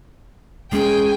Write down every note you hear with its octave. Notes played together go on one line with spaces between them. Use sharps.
E1 G#3 C#4 G#4 G5 G#5